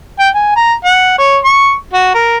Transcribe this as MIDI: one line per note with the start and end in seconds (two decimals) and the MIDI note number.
0.19 0.29 79
0.35 0.54 80
0.56 0.74 82
0.85 1.15 78
1.19 1.38 73
1.45 1.75 85
1.93 2.14 66
2.15 2.37 70